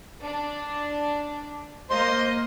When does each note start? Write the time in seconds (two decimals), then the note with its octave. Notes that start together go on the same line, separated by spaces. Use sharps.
0.23 D4
1.90 A#3 C5 D#5 C6